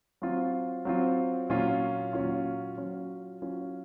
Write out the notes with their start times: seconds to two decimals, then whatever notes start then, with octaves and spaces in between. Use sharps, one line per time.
0.22 F#3 C4 F4
0.85 F#3 C4 F4
1.50 A#2 F#3 C#4 F4
2.13 A#2 F#3 C#4 F4
2.77 F#3 C#4 F4
3.42 F#3 C#4 F4